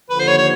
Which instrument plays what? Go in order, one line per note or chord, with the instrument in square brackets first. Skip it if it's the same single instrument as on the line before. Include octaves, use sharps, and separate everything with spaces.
[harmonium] D#2 D3 F3 [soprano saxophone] B4
[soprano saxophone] C5
C#5
C#5